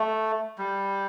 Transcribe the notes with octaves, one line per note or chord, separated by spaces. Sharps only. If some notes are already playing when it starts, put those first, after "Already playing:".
Already playing: A3
G3